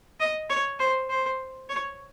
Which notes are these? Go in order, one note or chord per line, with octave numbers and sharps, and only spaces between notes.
D#5
C#5
C5
C5
C#5